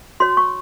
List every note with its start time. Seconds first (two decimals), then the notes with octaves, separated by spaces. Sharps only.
0.20 F#4 C#5 C6
0.37 C#6